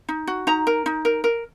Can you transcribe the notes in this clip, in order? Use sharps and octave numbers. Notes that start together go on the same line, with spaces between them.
D#4
F#4
D#4 A#5
A#4
D#4
A#4
A#4